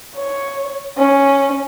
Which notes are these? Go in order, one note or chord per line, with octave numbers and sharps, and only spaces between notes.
C#5
C#4